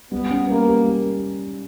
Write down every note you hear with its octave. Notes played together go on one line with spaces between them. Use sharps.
G3 B3
C#4
G3 A#3
G4
G3